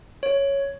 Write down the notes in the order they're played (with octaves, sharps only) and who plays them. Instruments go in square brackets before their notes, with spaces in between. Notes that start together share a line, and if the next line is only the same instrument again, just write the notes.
[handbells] C#5